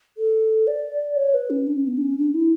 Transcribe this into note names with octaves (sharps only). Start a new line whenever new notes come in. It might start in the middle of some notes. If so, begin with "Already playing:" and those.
A4
D5
C#5
B4
C#4
D4
C#4
B3
D4
C#4
D4
E4